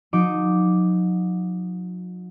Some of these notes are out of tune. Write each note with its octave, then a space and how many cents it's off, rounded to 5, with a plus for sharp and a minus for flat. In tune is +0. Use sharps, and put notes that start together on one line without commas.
F#3 -40 D#4 +0 D6 +0